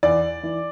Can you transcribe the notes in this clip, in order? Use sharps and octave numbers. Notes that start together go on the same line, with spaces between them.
E2 D5
E3